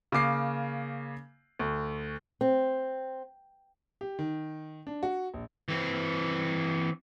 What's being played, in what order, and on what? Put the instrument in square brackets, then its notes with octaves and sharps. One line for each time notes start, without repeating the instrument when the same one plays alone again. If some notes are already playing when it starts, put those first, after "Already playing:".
[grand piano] C#3 A#3 D6 C7
D2
[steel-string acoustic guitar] C4
[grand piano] G4
D#3
D4
F#4
A#1
[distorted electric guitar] E3 C4